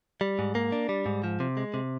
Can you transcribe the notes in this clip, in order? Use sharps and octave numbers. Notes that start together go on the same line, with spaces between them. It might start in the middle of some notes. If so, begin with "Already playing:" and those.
G3
G#2
A#3
D4
G3
G#2
F3
C3
G#3
C3